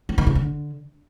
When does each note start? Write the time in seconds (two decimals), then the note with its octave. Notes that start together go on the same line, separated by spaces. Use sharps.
0.09 F3
0.18 D#3
0.27 C3
0.35 D3